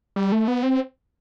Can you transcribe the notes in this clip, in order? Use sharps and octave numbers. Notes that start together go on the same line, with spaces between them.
G3
A3
B3
C4